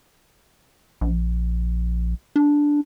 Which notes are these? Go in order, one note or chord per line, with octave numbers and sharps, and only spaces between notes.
A#1
D4